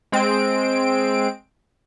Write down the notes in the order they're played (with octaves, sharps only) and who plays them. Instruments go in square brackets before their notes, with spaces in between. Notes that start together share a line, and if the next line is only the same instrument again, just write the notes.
[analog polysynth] G#3 C4 D7